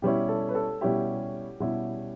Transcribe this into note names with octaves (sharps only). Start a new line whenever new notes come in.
B2 G3 C#4 E4 G4
A4
B4
A4
B2 G3 C#4 E4 G4
B2 G3 C#4 E4